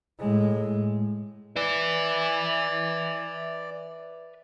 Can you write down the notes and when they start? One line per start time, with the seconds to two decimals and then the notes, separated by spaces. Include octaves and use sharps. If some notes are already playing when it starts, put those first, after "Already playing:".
0.19 A2 G#3
1.56 B4 D5 E5